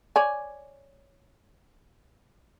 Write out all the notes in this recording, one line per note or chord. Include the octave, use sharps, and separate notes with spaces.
C#5 D5 G#5